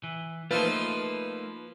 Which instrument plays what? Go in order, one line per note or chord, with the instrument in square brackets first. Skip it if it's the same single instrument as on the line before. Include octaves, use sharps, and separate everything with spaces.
[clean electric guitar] E3
[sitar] F3 F4 [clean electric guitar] A3 A#3 D#4 [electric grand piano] B4